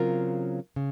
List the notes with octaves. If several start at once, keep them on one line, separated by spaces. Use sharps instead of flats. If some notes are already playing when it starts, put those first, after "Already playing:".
Already playing: C#3 F#3 C4 F4 A#4
C#3